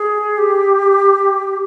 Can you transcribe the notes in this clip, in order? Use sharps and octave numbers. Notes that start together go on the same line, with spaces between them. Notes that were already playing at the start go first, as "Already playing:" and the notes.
Already playing: G#4
G4